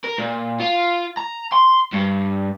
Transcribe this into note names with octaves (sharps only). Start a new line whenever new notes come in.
A#4
A#2
F4
A#5
C6
G2